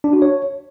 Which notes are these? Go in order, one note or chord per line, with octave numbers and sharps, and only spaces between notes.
D4
F#4
C#5